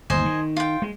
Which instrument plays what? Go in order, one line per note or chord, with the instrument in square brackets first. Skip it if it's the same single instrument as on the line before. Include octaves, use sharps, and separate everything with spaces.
[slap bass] G1 D#2 [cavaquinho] C5 D#5 G#5
[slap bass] D#3
[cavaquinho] F4 G5
[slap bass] G#3